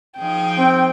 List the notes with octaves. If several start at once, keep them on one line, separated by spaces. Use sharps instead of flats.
F3 D#4 G#4 G5
C4